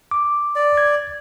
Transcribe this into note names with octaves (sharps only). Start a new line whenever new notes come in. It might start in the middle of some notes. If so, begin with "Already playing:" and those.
D6
D5
G#6